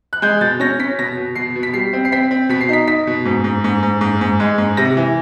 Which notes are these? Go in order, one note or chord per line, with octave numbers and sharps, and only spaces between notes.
F#6
G#3 G6
B2 A6
C#4 A#6
C#4 B6
B2 A#6
B2
B2 C7
B2
B6
G3 C7
C4
C7
C4 B6
C4
B2 B6
C7
D#4 B6
D#4 B6
B2
G#2
G#2
G#2
G#2
G#2
G#2
G#3
G#2
C3 A#6
E3